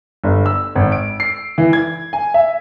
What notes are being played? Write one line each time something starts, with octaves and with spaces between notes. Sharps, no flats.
G1
E6
G#1
D7
C7
E3
G#6
G#5
E5